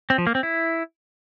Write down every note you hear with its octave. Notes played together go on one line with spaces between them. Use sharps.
C4
F3
A#3
C4
E4